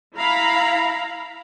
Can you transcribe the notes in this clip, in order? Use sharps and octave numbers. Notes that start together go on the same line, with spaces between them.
E4 F5 A#5 B5